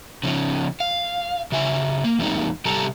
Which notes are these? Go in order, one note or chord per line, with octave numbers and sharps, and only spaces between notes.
C#3 F3 C#4 D#4
F5
C#3 F#4 E5 G#5
A#3 A#4
E2 G3 G#3 A#3 C4 D#4
C3 G3 G4 A4 A5 A#5